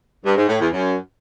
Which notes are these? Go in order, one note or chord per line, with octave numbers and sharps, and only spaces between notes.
G2
G#2
A2
E2
F#2